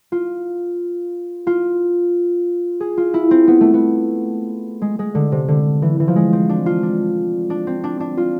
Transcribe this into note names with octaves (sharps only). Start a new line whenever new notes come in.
F4
F4
G#4
F4
E4
C4
B3
A3
B3
G#3
G#3
D3
C3
D3
E3
E3
F3
G#3
C4
D4
F4
D4
D4
C4
D4
D4
F4